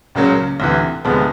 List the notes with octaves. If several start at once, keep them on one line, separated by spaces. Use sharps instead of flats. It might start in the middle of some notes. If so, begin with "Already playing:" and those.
C#2 C#3 F#3 A#3 C#4
D2 C3 E3
D2 C3 F3 G#3 B3